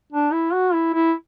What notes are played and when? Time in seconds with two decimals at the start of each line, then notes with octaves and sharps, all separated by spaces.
0.13 D4
0.33 E4
0.53 F#4
0.74 E4
0.94 E4